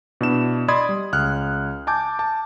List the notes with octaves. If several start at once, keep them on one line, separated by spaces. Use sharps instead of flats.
B2 D4 E4 E7
D5 D#5 B5 C6 D#6 G#6
G3
C#2 F6 F#6
G#5 A5 D6 G6
A5